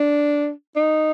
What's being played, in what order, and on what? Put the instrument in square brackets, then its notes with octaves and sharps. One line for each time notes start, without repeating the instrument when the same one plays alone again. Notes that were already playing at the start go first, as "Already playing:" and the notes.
Already playing: [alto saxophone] D4
D#4